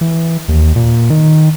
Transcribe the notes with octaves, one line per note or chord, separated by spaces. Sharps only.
E3
D#2
A#2
D#3